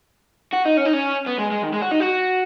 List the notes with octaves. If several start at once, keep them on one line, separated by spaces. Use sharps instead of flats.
F#4
D#4
C#4
D#4
C#4
B3
G#3
G#3
D#3
G#3
F#4
D#4
F#4